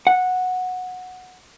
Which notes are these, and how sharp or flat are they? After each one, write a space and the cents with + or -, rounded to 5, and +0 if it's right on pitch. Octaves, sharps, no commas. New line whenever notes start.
F#5 -10